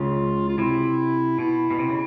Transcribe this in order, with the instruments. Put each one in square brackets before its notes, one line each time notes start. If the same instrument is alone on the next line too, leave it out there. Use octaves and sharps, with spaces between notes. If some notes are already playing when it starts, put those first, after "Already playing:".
Already playing: [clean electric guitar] C#2 C#3 [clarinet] F4
[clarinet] F4
[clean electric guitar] C3 [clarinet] E4
[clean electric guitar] B2 [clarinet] E4
[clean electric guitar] B2
C3
C#3